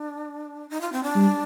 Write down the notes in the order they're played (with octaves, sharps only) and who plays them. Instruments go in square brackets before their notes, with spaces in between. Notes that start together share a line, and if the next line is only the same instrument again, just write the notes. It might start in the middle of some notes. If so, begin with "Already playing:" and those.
Already playing: [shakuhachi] D4
D#4
F4
C4
D4
[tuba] G3